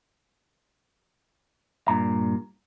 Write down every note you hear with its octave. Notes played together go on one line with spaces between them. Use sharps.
G2 A#2 A#5